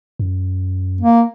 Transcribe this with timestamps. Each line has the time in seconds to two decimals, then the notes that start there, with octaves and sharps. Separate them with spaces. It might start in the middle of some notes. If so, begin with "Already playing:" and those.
0.19 F#2
1.01 A#3